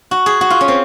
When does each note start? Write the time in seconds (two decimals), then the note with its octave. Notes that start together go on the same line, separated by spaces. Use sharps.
0.11 F#4
0.26 G#4
0.41 F#4
0.50 F4
0.61 C#4
0.68 C4